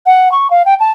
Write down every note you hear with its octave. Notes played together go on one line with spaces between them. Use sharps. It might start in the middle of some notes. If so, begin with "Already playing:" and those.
F#5
C#6
F5
G5
A5